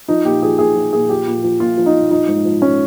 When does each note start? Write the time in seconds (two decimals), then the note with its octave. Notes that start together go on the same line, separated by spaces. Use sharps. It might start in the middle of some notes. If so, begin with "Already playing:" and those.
0.08 F3 D#4
0.25 A#2 G4
0.42 F3 G#4
0.59 A#2 G#4
0.75 F3
0.93 A#2 G#4
1.09 F3 G4
1.27 A#2
1.44 F3
1.60 A#2 F4
1.77 F3
1.86 D#4
1.94 A#2
2.10 F3 D#4
2.28 G#2
2.45 F3
2.61 G#2 C#4